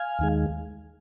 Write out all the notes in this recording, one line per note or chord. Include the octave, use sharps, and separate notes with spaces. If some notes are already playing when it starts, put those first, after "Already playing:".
Already playing: F5 G#5
D#2 D#3 G#3